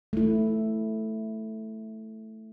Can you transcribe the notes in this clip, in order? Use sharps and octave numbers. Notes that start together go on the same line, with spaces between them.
A3 E4